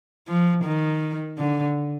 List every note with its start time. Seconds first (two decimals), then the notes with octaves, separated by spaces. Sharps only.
0.28 F3
0.64 D#3
1.38 D3